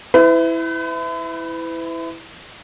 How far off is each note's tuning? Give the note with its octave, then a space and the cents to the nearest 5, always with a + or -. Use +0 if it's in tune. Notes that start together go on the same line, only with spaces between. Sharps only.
E4 +0 B4 +40